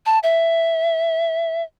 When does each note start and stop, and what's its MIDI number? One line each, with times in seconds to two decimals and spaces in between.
0.06 0.19 81
0.23 1.63 76